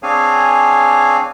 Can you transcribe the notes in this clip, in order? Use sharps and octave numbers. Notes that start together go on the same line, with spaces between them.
C4 D4 G#4 C#5 F5 G#5